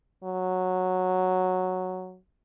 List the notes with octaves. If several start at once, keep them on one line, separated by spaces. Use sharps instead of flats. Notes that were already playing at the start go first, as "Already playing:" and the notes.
F#3